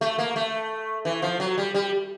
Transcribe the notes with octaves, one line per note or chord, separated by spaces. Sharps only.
A3
A#3
A3
E3
F3
F#3
G3
G3